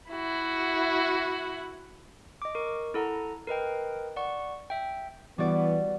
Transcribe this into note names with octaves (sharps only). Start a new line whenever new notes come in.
E4 F#4
D#5 D6
A#4 C#6
E4 A4 F#5 A#5
A#4 B4 D#5 G5
D5 F#5 C#6
E5 G5
E3 G3 B3 F#4 D5